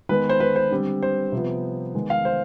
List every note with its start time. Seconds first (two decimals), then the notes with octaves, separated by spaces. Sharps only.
0.09 D#3 G#3 B3 B4
0.29 C5
0.40 B4
0.56 C5
0.71 D3 G3 C4
1.03 C5
1.32 C3 F3 B3
1.94 D#3 G#3 B3
2.10 F5
2.25 C5